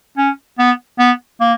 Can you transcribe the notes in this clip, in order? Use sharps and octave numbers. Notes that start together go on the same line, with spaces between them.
C#4
B3
B3
A#3